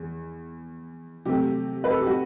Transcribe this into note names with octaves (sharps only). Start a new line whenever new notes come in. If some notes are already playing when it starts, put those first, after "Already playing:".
Already playing: E2
C3 F#3 A3 G4
B4
A4
G4
F#4